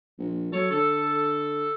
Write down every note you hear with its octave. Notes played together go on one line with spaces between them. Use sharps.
A#1
F#3 A4 C#5
D3 A4